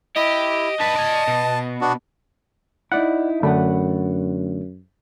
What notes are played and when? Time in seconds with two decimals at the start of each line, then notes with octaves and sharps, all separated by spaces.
0.16 E4 G4 D#5
0.80 D4 B4 A5
0.97 D5 G#5
1.28 B2
1.81 B3 D4 F#4
2.92 D#4 E4 D5 F#5
3.43 F#2 D3 A3 D4 F#5 G5 B5